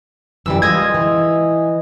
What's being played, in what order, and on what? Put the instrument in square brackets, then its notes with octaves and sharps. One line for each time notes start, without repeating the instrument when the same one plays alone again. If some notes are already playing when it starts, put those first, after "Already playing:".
[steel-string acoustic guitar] F#2 E3 G3 [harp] E6
[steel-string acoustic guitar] G#3 F4 [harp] D#5 G#6
[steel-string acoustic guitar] E3